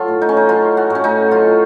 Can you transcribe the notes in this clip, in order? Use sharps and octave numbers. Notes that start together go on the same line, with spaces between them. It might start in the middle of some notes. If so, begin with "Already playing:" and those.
Already playing: F#3 F4 A4
A2
D#4
C#4
D#4
F#3 F4
F#4
A2 C#4
D#4
F#3 F4